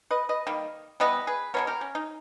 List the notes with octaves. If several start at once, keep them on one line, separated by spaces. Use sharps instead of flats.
B4 D#5
B4 D#5
D#3 G3 A#3
E3 G3 B3 B4 D#5
G#4 B4
B2 G#3 B3 A#4 C#5
G4 A#4
C#4
D#4